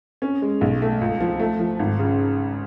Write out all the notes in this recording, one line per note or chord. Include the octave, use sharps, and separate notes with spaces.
C#4
G#3
B1
A3
C#2
F3
A3
F3
G#1
C#3